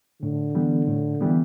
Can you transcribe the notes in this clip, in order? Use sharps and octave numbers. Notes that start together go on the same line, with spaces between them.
A2 D3
E3 G3 B3
A2
E3 G3 B3